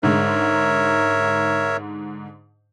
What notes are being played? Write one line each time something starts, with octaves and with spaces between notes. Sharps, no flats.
G#2 D3 G#3 A#4 C#5 E5